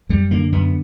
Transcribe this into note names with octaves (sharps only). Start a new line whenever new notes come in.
F#2 G3
D3 A#3
F#2 B3